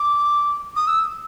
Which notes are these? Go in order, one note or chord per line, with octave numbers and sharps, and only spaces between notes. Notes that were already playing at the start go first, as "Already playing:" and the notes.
Already playing: D6
D#6
E6